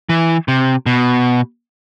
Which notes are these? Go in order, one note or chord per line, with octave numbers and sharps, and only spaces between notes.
E3
C3
B2